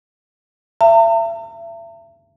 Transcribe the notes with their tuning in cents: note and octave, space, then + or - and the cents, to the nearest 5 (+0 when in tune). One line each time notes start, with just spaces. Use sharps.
E5 +35 A#5 -45